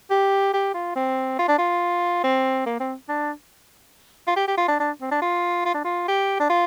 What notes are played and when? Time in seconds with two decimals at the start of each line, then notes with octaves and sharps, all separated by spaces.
0.10 G4
0.53 G4
0.74 F4
0.95 C4
1.39 F4
1.48 D4
1.58 F4
2.24 C4
2.66 A#3
2.80 C4
3.09 D4
4.27 F4
4.36 G4
4.48 G4
4.57 F4
4.68 D4
4.80 D4
5.01 C4
5.11 D4
5.22 F4
5.65 F4
5.74 D4
5.84 F4
6.08 G4
6.40 D4
6.49 F4